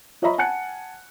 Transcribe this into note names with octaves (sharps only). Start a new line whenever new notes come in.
F4 C#5 D#5 E5 A#5 B5
F#5 G#5 A5 F#6 C#7